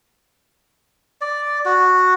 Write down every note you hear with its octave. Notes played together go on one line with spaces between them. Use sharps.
D5
F#4